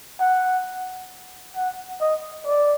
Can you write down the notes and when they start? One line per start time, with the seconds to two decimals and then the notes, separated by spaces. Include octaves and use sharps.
0.21 F#5
1.56 F#5
2.01 D#5
2.47 D5